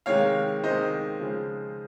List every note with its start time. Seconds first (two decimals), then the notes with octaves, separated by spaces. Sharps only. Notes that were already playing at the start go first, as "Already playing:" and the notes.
0.06 C3 D#3 G#3 C#5 F5
0.63 C3 D#3 G#3 C5 D#5
1.20 C#3 F3 G#3